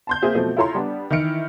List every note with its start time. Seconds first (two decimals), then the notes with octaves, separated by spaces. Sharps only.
0.07 A5 C6 G6
0.22 A#3 C4 G#4 E5
0.35 B2 F3 F#3 A3 C4
0.57 E4 F4 A4 C#5 A#5 C6
0.74 G3 B3 D4
1.10 D#3 E3 E4 F6 C#7 D7